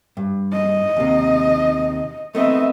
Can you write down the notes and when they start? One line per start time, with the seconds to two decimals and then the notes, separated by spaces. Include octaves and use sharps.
0.17 G2
0.53 D#5
0.97 D#2 C3
2.35 A3 B3 C4 D#5 E5